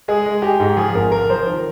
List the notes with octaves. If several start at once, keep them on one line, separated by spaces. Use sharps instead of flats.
G#3 G#4
G#3
G#3 G4
G#2
F3 G#4
G#1 A#4
F3 A#4
F3 C5
D#3 A#4